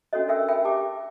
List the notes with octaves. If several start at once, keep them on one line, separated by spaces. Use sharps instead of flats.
C#4 D4 F#4 A4 C#5 D#5
C#4 D4 A#4 E5 G5 E6
A#4 E5 G5 B5
G4 A5 D6